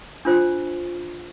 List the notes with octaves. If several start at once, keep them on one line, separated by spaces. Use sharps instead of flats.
D4 F4 C5